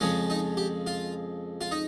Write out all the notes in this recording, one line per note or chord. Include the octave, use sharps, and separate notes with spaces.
F2 C#3 F3 G#3 C#4
D#4
G4
F4
F4
D#4